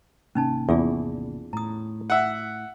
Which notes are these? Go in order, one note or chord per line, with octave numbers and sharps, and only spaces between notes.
G#1 C3 A#3 C#4 D#4 A5
E2 F4 G#4 D5
A2 A#5 D#6
E5 F#5